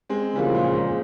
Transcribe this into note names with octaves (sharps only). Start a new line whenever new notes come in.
G#3 C4
C#3 E3 F3 G3 A#3 F4
A#2
G#2